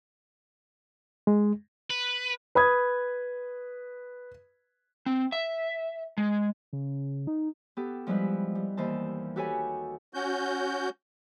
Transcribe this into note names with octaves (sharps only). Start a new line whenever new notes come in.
G#3
B4
B4 B5 D#6 G#6
C4
E5
G#3
C#3
D#4
B3 G4 A4
F3 G3 G#3 E4 B4
G3
D#2 E3 C5 A5
F#4 G4 A4 B4 C#5 G#5
C#4 F#4 G6